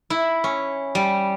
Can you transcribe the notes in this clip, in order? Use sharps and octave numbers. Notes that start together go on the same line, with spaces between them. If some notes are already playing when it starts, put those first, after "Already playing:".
E4
C#4
G3